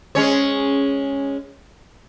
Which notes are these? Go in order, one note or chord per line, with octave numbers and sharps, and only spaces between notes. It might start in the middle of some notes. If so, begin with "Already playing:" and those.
G#3 C#4 C#5